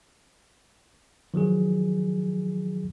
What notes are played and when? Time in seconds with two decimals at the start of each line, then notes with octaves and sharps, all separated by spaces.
1.34 D#3 F3 F#3 G#4